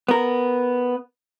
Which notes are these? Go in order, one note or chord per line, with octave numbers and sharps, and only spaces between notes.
B3 A#4